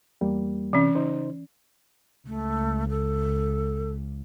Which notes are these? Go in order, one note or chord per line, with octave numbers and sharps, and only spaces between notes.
E2 G3 A#3
C3 E3 C#4
C#3 D#4 C5
C#2 A3
A4